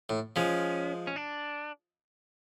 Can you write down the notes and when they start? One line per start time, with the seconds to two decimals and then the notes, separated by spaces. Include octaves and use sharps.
0.09 A2
0.36 F3 G#3 C#4
1.07 C#4
1.16 D4